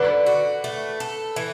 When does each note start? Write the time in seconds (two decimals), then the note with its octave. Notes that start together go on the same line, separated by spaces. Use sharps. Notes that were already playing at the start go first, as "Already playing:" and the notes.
Already playing: D3 B4
0.26 F#4
0.64 A3
1.00 A4
1.36 E3